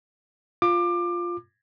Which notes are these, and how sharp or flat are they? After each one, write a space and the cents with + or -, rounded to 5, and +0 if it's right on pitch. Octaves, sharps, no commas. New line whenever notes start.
F4 +0 D6 +25